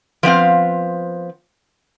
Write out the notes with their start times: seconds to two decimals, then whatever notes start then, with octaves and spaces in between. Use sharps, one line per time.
0.23 F3 B3 C4 F5